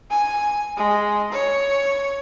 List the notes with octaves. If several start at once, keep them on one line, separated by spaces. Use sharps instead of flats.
G#5
G#3
C#5